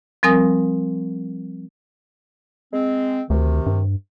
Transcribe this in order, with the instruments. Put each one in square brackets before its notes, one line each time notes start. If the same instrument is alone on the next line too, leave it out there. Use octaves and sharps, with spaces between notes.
[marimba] F3 G3 C4 A#4 G#5 D#6
[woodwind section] G#3 C4
[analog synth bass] D2 [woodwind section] C3 D#3
[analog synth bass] G2